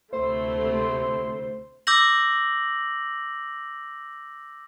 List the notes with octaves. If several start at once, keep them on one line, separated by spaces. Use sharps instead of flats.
D2 C3 A3 E4 C5 C6
D6 E6 G6 A#6 F#7